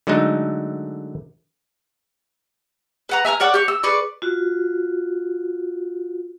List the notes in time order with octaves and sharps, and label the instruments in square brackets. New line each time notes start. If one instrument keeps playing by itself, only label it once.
[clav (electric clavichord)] D3 F#3 G#3 A3 D#4
[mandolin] B4 F#5 A#5
E5 G#5 A#5 F6
A#4 C#5 D5 F#5
G4 C#6
E6
G#4 B4 D5 C#6
[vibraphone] F4 F#4